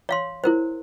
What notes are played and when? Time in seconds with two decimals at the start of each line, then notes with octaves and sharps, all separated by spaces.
0.09 C#5 F5 C6
0.44 E4 A#4 C5